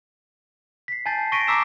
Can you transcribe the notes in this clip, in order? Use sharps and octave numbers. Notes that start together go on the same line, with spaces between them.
B6 C7
G#5 A5 G6 A6 C7
C#6 A#6 B6 D7 D#7
A#5 D6 E6 B6 C7 E7